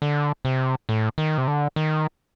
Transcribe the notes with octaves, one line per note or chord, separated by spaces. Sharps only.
D3
C3
A2
D#3
C3
D3
D#3